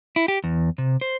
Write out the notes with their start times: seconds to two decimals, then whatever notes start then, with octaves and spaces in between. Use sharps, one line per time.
0.16 E4
0.28 G4
0.44 E2
0.78 C3
1.01 C5